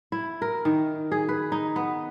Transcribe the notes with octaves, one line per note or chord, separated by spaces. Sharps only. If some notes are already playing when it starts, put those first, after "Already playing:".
E4
A#4
D#3
G#4
B4
D#4
B3